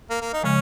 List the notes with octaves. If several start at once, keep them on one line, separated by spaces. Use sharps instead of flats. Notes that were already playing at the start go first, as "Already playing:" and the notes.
A#3
A#3
D#4
C#3 F3 G#3 C#4